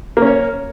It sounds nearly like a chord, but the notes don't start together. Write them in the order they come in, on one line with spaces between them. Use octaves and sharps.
A#3 C#4 C#5